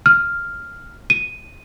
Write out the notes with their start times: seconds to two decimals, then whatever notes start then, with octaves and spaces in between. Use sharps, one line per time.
0.06 F6
1.10 D#7